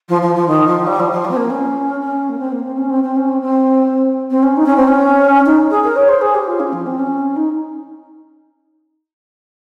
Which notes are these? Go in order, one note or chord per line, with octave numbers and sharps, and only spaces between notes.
F3
F3
F3
D#3
F3
G3
F3
F3
G3
C4
A#3
C#4
C#4
A#3
C4
A#3
C4
C#4
C4
C4
C#4
C4
C4
C4
C#4
D#4
C#4
C4
C#4
D#4
G#4
A#4
C#5
C5
G#4
G4
F4
C#4
F3
C4
C#4
D#4